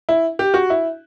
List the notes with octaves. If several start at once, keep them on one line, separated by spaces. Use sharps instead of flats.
E4
G4
F#4
E4